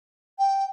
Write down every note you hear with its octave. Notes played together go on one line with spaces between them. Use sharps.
G5